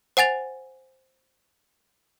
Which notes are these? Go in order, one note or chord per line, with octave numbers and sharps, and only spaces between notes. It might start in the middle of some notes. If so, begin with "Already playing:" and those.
C5 F#5 G#5 A6 F7